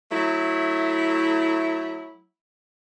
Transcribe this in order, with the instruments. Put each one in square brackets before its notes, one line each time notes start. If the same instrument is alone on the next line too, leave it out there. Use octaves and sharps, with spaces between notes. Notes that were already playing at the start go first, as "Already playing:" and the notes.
[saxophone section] F#3 A3 E4